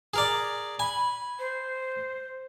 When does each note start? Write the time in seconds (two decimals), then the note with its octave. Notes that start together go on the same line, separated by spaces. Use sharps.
0.14 G#4 A#4 D5
0.79 G#5 B5
1.39 C5